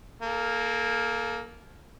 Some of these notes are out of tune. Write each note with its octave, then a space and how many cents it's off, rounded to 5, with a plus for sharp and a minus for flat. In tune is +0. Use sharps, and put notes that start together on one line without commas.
A#3 +0 A4 -40